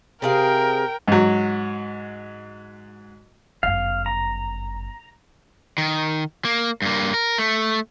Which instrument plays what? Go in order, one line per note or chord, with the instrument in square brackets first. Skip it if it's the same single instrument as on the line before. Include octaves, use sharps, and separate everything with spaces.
[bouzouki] C3 G#4 F5 [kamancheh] A#4 G5
[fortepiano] G#2 F#3
[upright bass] G1 F#2 [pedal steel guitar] F5
[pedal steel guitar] A#5
[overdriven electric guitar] D#3
A#3
G2 A#3
A#4
A3